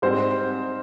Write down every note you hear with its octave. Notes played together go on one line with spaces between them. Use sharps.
G#2 G3 C4 C5